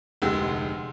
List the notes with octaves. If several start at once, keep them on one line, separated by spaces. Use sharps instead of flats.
F1 D2 G#3 G4 E6